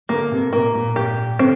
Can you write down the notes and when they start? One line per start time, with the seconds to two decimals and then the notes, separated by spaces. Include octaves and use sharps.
0.09 D3 A#3
0.31 C3
0.53 A#2 A#3
0.74 A#2
0.96 A#2 G4
1.39 D3 C4